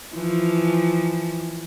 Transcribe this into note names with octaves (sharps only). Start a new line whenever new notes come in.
E3 F3